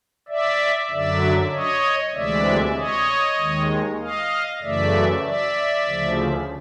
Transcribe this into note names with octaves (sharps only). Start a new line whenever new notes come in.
D5 E5
F#2 D3 F#3 D5 E5
C#5 D#5
D2 C3 E3 G#3 D5 E5
C#5 D#5
D#2 D#3 G#3
D#5 F5
F#2 C#3 E3 A3 D5 E5
D5 E5
D2 C#3 F3